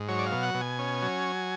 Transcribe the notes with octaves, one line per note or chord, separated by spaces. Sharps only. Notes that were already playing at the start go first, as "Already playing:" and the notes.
Already playing: G#2
F#3 C#5
D5
F5
B2
F#5
B2
G#5
C#4
F#3